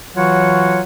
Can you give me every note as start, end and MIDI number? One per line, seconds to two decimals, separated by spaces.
0.16 0.81 52
0.16 0.81 54
0.16 0.81 65
0.16 0.81 66
0.16 0.81 73
0.16 0.81 78